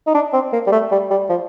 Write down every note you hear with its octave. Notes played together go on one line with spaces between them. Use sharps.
D#4
D4
C4
A#3
G3
A3
G3
G3
F3